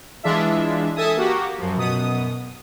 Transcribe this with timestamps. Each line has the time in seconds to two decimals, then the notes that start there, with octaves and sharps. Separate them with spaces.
0.23 E3 G#3 D4 F4 E5
0.96 A4 E5 G#5 A5 D#6
1.16 A#3 F#4 G4
1.58 F#2 F3
1.77 F#2 B2 B3 D#6